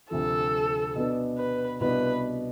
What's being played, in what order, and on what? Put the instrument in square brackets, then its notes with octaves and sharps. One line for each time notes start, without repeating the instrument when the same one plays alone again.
[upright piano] D2 C3 F3 [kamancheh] A4
[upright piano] B2 B3 D4
[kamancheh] B4
[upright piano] C2 B2 B3 D4 [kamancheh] B4